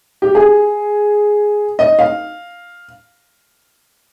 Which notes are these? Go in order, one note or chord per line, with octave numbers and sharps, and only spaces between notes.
G4
G#4
D#5
F5